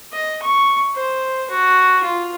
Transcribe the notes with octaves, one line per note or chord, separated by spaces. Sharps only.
D#5
C#6
C5
F#4
F4